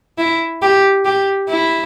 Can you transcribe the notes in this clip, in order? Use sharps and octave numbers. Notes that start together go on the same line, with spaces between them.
E4
G4
G4
E4